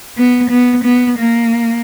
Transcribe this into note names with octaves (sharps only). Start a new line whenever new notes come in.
B3
B3
B3
A#3